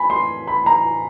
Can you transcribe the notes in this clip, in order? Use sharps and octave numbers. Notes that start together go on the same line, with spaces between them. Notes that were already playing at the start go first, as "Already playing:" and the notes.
Already playing: G#5 B5
C6
B5
A#5